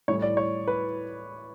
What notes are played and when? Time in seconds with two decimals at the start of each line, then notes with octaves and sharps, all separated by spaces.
0.08 A2 E3 G3 C#5
0.22 D5
0.37 C#5
0.67 B4